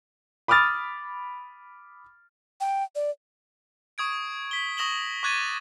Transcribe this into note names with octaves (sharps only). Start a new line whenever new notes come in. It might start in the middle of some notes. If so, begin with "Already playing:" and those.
B5 D6 D#6 F6 A6
G5
D5
C#6 D#6 G#6 D7
B6 G7
C#6 D#6 A#6 E7 F#7 G7
C#6 D6 F#6 G#6 A6 D#7